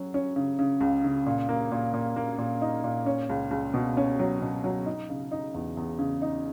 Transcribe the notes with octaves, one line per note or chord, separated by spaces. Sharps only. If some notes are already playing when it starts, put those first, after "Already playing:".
Already playing: F#3 C#4
C#4
C#3
C#3
C#2
C#3
A#2
A#3
A#2
A#2
A#3
A#2
D#4
A#2
C#4
C#2
C#2
B2
C#4
F#3
B2
F#3
D#4
C#3
D#4
E2
E2
C#3
D#4